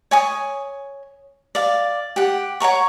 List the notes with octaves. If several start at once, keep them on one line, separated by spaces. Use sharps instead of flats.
C#5 G#5 D#6
D5 F5
G4 F#5
C#5 F#5 A#5 C#6